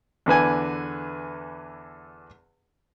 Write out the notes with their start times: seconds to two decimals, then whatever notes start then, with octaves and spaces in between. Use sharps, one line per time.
0.26 E2 D3 B4 G#5